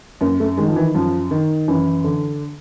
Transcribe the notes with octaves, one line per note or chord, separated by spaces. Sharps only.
F#2 A#3
A3
D#3 G#3
F3
E3
F#2 F3
D#3
F#2 E3
D3